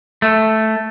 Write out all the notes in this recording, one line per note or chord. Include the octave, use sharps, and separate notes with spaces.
A3